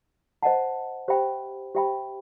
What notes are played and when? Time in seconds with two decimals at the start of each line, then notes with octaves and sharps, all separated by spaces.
0.42 C5 D#5 F#5 A5
1.08 G4 C5 E5 G5 B5
1.75 G4 C5 E5 G5 B5